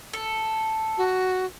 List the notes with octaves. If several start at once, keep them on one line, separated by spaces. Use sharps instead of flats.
A4
F#4